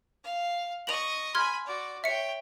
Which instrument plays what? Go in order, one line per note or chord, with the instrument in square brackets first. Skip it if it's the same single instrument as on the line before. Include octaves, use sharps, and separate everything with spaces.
[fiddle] F5
[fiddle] D#5 C#6 [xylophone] F7 F#7
[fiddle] G#5 B5 [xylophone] C6 F6 G#6
[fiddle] F#4 D5
[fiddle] C#5 G5 [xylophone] E5 C#7